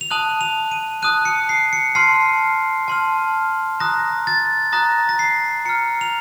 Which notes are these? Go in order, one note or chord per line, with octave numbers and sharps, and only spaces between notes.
F7
A5 D#6 F#6 F#7
F7
D#7
A5 D#6 F#6 D#7
C#7
C7
C#7
A5 C6 F6 C7
A5 C6 F6
A#5 D#6 F#6 A#6
A6
A#5 D#6 F#6 A#6
A#6
C7
A#5 F6 C#7
F7